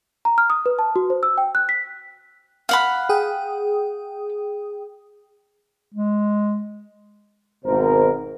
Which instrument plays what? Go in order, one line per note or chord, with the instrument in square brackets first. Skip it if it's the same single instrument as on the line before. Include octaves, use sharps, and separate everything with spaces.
[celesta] A#5
F6
D#6
B4
A5
F#4
C5
E6
G5
F#6
B6
[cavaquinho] F5 F#5 B5
[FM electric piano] G#4 G5 D#6
[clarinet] G#3
[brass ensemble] G#1 B2 A#4 C5